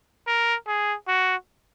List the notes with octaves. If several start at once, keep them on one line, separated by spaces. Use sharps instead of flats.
A#4
G#4
F#4